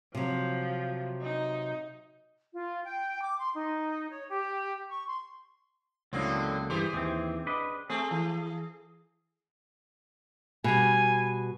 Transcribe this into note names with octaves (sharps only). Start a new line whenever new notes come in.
C3 F3 F#3
D#4
F4
G5
D6
C6
D#4
C#5
G4
C#6
C6
C#2 A2 D3 F#3 A#3 C4
G2 E3 G4 G#4 C5
D#2 E3 C4
D4 B4 D#5
A3 C4 G#4
E3
B2 G3 G#5